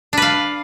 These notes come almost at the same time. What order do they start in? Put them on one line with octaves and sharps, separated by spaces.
D4 B4 F5